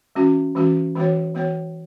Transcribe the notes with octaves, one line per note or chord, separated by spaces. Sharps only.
E3 G#3 C#4 F#4
E3 G#3 C#4 F#4
E3 G#3 B3 F#4 C#5
E3 G#3 B3 F#4 C#5